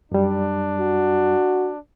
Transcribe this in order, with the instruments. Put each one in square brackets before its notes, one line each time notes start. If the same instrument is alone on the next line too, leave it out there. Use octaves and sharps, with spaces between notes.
[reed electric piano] F#2 G3 [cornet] D4
[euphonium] F#4